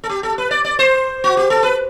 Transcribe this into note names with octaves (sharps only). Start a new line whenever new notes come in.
A4
G4
A4
B4
D5
D5
C5
F#4
G4
A4
B4